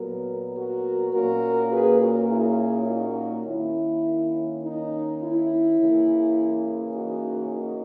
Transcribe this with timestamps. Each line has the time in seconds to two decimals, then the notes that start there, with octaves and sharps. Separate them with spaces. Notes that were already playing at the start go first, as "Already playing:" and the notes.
Already playing: A#2 F#3 B3 F#4 A#4
0.54 F#4 A#4
1.12 A#2 A#3 C#4 F#4 A#4
1.71 G#4 B4
1.99 F#4 A#4
2.29 E4 G#4
2.87 D#4 F#4
3.45 D#3 A#3 C#4 E4
4.63 D#4
5.20 E4
5.78 C#3 E3 A#3
6.95 D#4 F#4
7.53 D#4 F#4